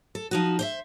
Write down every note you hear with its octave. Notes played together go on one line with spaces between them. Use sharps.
A4
F3 D#4 F#4
C5 C#5 E5